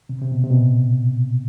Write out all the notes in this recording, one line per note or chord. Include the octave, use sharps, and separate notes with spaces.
C3
C3
B2
C3
B2
A#2